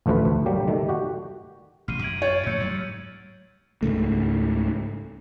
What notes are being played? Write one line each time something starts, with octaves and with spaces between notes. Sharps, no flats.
A1 D2 F3 A3 F4 B4
D2
F#3 G3 A#3 D4 G4
D#3 G3 A3
F#4 G4
A1 C3 F6 C7 D#7
F#2 G#6 D7 F#7
C#5 G6 A6 F#7
A2 F3 E6 G6 C#7
G#2 F#3 G3
C#2 G#2 C#3 A3